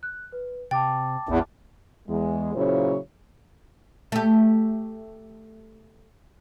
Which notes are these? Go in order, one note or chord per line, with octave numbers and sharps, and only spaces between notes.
F#6
B4
C3 G5 A5 D6 A6
A1 E2
E2 G#3
A#2 C#3 F#3 E4 C5 C#5
A3 G4